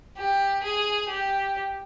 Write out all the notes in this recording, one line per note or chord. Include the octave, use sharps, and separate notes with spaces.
G4
G#4
G4